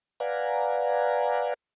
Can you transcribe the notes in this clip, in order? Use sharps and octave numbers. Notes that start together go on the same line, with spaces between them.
B4 D5 F5 F#5 G#5 A#5